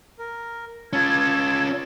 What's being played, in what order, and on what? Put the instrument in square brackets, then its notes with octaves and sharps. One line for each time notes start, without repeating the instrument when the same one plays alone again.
[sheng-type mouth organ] A#4
[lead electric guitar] C#4 F4 [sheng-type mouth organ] A5 E6 [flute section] G#6